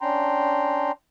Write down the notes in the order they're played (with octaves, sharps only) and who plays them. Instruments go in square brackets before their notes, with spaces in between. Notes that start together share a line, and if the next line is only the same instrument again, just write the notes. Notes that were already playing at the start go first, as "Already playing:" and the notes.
[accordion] C#4 D4 G5 A#5 C6